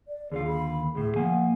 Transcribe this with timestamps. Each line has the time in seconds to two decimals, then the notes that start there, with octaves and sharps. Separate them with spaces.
0.08 D5
0.32 D#2 D3 F4 G#4
0.47 B5
0.95 D2 A2 G#4
1.16 F3 A#3 F#5 G#5